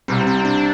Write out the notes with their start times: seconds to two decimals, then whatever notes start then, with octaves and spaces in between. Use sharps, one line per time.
0.08 C2 C3 G3 C4
0.27 C4
0.45 D4